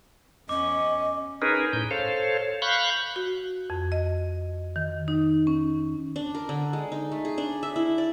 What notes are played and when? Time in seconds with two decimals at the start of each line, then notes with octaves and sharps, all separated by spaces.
0.49 E2 C#4 D#5 D6
1.42 C#4 D#4 G#4 A#4 B4
1.73 A2 G6
1.91 A4 C5 C#5 F5
2.62 F5 B5 C#6 F#6 G6
3.16 F#4
3.70 F2
3.92 D#5
4.76 D#3
5.08 D#4
5.47 C#4
6.16 D4
6.35 A#4
6.49 D3
6.73 G#3
6.92 D#4
7.12 A3
7.25 G#4
7.38 D4
7.63 E5
7.76 E4
7.98 D5